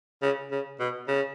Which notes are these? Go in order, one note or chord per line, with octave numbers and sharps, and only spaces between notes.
C#3
C#3
B2
C#3